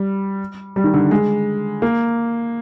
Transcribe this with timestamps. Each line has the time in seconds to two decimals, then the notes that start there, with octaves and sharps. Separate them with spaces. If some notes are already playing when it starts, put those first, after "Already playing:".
Already playing: G3
0.76 G3
0.84 D#3
0.94 D3
1.11 G#3
1.82 A#3